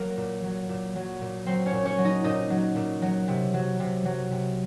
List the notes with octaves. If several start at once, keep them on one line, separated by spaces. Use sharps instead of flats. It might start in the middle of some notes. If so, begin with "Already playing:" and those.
Already playing: F#3 A#3 A#4
A#2
F#3
A#2
F#3
A#2
F#3 C4 C5
C#4 C#5
A#2
C#4 C#5
F#3
D#4 D#5
A#2 D#4 D#5
F#3
A#2
F#3
C3
F#3
C3
F#3
C3